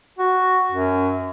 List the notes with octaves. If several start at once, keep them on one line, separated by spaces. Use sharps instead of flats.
F#4
F#2